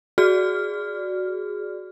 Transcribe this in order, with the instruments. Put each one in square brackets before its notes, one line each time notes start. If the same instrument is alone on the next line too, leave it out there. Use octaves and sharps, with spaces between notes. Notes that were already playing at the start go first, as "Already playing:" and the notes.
[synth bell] F#4 G#4 D5 F6